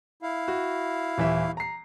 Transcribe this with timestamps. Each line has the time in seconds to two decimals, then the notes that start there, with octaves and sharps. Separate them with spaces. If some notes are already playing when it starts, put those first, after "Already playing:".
0.22 E4 F5
0.48 F#4
1.18 D#1 E3 E5
1.57 A#5 C7